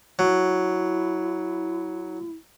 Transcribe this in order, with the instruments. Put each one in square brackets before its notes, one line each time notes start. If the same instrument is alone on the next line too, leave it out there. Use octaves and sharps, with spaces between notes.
[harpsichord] F#3 [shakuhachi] E4